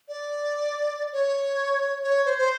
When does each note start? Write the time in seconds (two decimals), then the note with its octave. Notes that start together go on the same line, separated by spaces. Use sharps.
0.08 D5
1.13 C#5
2.04 C#5
2.25 C5
2.38 C5